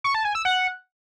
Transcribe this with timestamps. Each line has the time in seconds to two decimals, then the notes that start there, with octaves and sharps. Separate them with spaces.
0.04 C#6
0.15 A5
0.25 G#5
0.35 E6
0.45 F#5